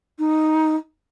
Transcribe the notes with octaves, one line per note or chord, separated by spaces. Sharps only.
D#4